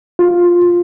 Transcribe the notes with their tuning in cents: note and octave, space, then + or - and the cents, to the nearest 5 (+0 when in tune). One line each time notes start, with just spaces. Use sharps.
F4 +5